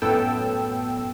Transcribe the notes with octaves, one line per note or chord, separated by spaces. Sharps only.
F#2 A2 B3 A4 G5 E6